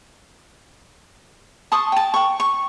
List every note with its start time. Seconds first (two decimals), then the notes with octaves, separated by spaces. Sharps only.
1.72 A5 C6 C#6 D#6
1.92 G5 A5
2.14 G5 C#6
2.40 C#6